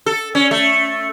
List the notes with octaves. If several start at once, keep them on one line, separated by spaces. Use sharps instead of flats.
A4
C#4
A3